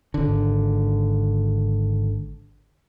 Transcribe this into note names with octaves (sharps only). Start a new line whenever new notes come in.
G#1 D3